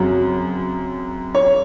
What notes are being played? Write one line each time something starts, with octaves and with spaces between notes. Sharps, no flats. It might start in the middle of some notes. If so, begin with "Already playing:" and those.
Already playing: F#2 C#3 F#3 C4 F#4
C#5